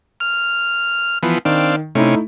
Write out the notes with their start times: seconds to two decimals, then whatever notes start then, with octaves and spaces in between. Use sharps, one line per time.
0.20 F6
1.23 E3 F3 B3
1.45 D#3 C4 D4 F5
1.95 C3 A3 C#4 D#4 E4